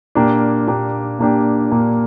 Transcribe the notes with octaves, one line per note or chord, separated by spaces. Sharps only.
A#2 A#3 D4 G4
A#2 A#3 D4 G4
A#2 A#3 D4 G4
A#2 A#3 D4 G4